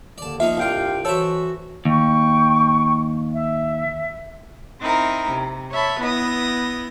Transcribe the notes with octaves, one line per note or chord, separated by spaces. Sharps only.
D#2 D3 D#3 D5 A5
F3 A#3 D#4 E5
C2 G2 F4 G4 F5 G5
E3 F#4 A4 C5 C#5 E5 E6
D#2 G5 C#6
E5
C4 D#4 E4 A#4
C3
C#5 E5 A5 B5
B3 E4 D#6 A#6